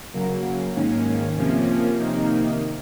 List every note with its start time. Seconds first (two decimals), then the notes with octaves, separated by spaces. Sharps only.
0.13 C#3 F#3 A#3
0.75 G#2 D#3 A#3 C#4
1.37 C3 F3 A#3 C#4
1.99 C3 D#3 A#3 D#4